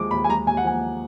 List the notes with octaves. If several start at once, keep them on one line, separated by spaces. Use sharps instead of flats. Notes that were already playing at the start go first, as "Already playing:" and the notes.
Already playing: D#2 F3 G#3 D6
D#2 B5
G#5
G#3 A#5
D#2 G#5
F#5
F3 G#5